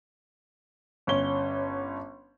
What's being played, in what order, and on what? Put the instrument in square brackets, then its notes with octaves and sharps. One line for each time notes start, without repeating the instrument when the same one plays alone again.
[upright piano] G1 C#4 G7